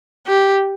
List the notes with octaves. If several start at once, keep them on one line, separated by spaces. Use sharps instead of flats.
G4